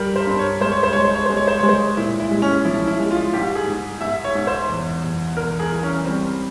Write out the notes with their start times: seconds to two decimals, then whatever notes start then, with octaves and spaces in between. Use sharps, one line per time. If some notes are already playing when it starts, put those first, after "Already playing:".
Already playing: G2 G3 G4 A#4
0.16 C5
0.27 G2
0.39 C#5
0.60 G#3 C5
0.72 C#5
0.83 C5
0.93 G#3 C#5
1.05 C5
1.15 C#5
1.26 G#3 C5
1.37 C#5
1.47 C5
1.58 G#3 C#5
1.69 C5
1.97 A#2 E4
2.20 E4
2.31 G#3
2.42 C#4
2.65 F3 E4
2.87 E4
2.99 G#3
3.11 F4
3.33 G#2 G4
3.55 G#4
3.68 G#2
4.01 G#2 E5
4.24 C#5
4.35 G#2
4.47 C5
4.69 E2
5.04 E2
5.37 E2 A#4
5.60 G#4
5.72 E3
5.83 C#4
6.05 G3 C4